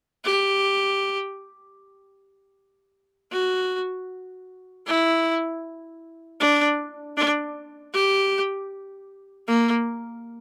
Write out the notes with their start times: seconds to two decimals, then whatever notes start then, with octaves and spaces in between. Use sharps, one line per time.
0.25 G4
3.32 F#4
4.87 E4
6.40 D4
7.17 D4
7.94 G4
9.48 A#3